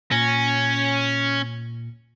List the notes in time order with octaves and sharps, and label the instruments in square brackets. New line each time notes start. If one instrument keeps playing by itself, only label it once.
[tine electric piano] A#2 A#6 [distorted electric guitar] C#4